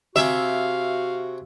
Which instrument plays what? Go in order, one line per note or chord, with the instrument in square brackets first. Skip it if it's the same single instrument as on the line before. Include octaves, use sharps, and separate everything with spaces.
[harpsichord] C3 G#4 G5 [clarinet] F#4 [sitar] E5 [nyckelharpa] F5